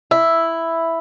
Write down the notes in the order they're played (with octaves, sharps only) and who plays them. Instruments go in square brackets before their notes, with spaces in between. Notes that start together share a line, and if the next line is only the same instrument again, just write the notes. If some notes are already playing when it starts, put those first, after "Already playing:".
[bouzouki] E4